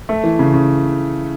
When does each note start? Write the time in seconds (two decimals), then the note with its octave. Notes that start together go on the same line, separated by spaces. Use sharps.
0.09 A3
0.24 E3
0.39 C#3
0.54 C#3